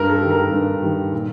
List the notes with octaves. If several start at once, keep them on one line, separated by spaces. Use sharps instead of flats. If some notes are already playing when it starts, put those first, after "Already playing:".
Already playing: G2 A#4
A4
D#3 G3
A#4
G2
D#3 G3
A#2